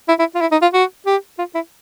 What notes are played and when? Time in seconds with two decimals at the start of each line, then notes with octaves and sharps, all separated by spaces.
0.09 E4
0.19 E4
0.35 F4
0.41 E4
0.52 D#4
0.62 F4
0.74 F#4
1.06 G4
1.39 F4
1.55 E4